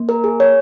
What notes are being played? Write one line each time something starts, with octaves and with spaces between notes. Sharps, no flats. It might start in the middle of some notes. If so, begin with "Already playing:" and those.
Already playing: A#3
A#4
G#4
C#5